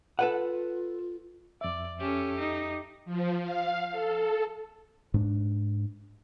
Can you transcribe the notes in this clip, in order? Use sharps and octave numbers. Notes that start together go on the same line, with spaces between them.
F4 A4 B4 F#5
F2 D5 E5
C#4 G4 A4
D#4
F3
F5
A4
G#2 D4